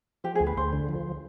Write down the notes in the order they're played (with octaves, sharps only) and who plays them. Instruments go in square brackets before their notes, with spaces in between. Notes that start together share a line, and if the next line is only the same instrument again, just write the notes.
[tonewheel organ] F3 [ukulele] G4
[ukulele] G#4
[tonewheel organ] D2
[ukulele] B4
[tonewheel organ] D2 [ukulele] C5
[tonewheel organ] D3
F3